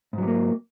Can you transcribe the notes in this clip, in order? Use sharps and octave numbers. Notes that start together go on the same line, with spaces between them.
G#2 F#3 G3 A#3